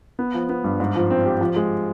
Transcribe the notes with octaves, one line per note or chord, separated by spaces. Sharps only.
B3
F3
B3
G2
G#2
F3
C4
G4
F3
G#3